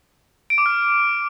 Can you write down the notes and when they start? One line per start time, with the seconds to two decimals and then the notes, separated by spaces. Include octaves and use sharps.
0.50 D7
0.58 D6
0.66 F6